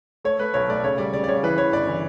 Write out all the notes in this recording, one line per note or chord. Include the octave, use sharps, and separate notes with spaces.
A3 C#5
A3 B4
B1 C#5
A3 D5
C#3 C#5
G3 D5
C#3 D5
D5
C#3 C#5
E3 B4
E3 C#5
G1 D5
E3